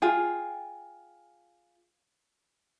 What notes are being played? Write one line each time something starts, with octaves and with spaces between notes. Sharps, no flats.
F4 G#4 G5